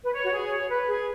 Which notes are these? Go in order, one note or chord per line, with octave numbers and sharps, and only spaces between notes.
B4
C#5
F#4
G#4
C#5
B4
G#4